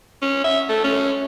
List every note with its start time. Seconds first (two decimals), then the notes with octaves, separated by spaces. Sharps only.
0.22 C#4
0.44 E5
0.69 A3
0.84 C#4